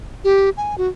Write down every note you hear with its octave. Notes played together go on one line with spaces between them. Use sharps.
G4
G#5
F#4